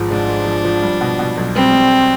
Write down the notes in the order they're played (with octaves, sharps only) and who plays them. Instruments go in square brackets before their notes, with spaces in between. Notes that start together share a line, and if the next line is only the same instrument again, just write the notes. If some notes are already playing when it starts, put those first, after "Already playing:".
Already playing: [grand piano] G#1 G#2 F3 G#3
[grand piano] G#2 [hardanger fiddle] D4
[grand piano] G#3
F3
F3
G3
B2
B2
B1
[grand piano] G3 [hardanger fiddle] C4
[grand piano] G3